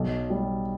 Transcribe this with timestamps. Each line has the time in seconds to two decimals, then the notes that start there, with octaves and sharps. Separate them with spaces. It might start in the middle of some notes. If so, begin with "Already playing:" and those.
Already playing: B1
0.30 G3